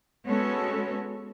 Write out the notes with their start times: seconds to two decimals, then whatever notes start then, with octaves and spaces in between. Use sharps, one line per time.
0.25 G#3 B3 C#4 F#4 A4 C#5